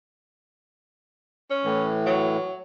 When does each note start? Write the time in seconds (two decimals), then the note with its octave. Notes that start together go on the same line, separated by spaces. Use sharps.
1.50 C#4
1.64 A2 E3
2.06 F#3